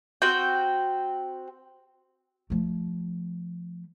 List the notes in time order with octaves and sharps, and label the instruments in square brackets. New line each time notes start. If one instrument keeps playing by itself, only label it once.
[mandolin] C4 F#4 G5
[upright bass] F3 A3